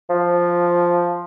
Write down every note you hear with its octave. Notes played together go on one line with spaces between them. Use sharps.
F3